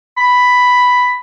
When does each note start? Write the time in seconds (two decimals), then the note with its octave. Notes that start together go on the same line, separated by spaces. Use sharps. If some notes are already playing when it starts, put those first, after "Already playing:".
0.18 B5